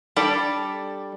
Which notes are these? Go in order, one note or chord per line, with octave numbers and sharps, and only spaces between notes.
G3 D4 A4 D5